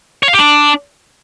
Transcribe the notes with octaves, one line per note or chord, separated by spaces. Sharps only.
C#5
F5
G4
D4